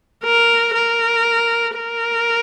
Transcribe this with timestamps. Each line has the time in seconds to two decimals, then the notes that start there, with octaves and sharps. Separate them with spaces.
0.24 A#4
0.75 A#4
1.77 A#4